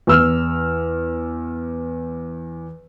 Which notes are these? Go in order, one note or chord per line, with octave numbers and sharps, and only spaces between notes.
E2 E6 F6